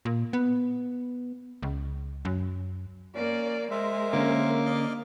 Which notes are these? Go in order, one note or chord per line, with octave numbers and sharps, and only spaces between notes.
A#2
B3
C#2
F#2
A#3 C#4 D5
G#3 A#4 C5 E5
D3 A#3 C#4
D5 D#5 F5